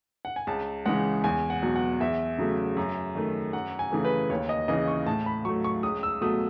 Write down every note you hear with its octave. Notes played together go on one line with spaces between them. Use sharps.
F#5
G#5
C#2 A5
C#3 E3 G#3 F#5
E2 G#5
F#5
B2 F#3
F#5
E2 E5
C#3 F#3 A3
F#2
D#3 A3
F#2 F#5
G#5
C#3 E3 A3
B4
D#2 C#5
D#5
C#3 E3 D#5
C#6
A2 A5
B5
F#3 A3 C#6
C#6
C#2 D#6
E6
B2 F#3 A3 D#6